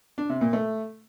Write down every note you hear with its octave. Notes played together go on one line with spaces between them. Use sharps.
D4
C3
A#2
A3